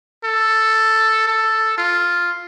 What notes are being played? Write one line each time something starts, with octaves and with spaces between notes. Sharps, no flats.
A4
A4
F4